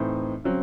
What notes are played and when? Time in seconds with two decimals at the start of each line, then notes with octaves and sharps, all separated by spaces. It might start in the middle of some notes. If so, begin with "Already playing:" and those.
Already playing: A2 E3 C4 D#4
0.44 C#3 F#3 C4